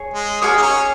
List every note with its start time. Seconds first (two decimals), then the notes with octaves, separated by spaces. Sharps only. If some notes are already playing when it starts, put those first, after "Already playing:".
Already playing: G#4 C#5
0.14 G#3
0.42 A#3 G#4 C#5 F#5 D#6
0.57 D#4
0.62 C#4